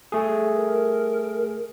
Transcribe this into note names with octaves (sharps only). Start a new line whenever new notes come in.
A3 G#4
A#4